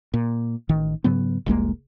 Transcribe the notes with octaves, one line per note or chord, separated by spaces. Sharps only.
A#2
A1 D#3
G#2 C#3 F#3 B3
F1 C2 G#3 A#3